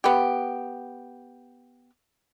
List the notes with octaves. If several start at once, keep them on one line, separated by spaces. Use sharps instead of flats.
B3 G4